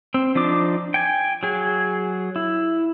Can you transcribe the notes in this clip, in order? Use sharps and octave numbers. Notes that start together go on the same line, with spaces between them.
C4
F3 D4 D#4 D6
G5 G#5
F#3 G#4
E4